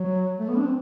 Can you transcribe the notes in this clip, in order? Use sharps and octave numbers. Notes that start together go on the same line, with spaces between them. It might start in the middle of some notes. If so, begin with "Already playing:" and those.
Already playing: F#3
A3
B3
D4
C4